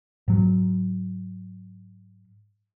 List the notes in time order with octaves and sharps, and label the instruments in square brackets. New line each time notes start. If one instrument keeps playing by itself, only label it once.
[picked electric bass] G#2 F#3